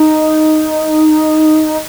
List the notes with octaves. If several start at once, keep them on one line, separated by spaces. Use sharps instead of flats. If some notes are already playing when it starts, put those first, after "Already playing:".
Already playing: D#4